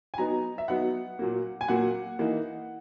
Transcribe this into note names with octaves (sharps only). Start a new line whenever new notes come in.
G#5
F#3 B3 D#4 A#5
E5
F#3 B3 D#4 F#5
A#2 F#3 A#3
G#5
A#2 F#3 A#3 F#5
E3 A#3 D#4